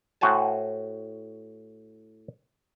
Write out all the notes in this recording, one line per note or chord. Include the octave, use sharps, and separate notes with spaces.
A2 F#4 C5 G#5 A5